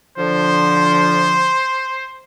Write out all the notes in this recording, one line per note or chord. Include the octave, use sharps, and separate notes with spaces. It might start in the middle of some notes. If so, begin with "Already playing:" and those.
D3 F3 C5